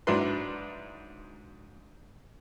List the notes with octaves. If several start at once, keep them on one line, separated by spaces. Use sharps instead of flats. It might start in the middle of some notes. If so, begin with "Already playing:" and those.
G#2 F#3 D4 E4 B4 C6